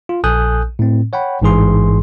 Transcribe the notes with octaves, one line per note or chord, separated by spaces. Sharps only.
F4
A#1 A4 G#5 D#6 F#6 G6
A2 C4
C#5 F#5 G5 B5
A1 G#2 E3 G#4 C6